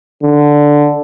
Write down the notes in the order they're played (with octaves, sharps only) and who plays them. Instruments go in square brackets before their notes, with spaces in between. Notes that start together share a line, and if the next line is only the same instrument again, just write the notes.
[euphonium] D3